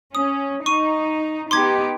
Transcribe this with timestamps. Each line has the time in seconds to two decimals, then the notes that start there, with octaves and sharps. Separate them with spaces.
0.15 C#4 D#6
0.66 D#4 C#6 D#7
1.51 B3 D#4 G4 C6 D6 G#6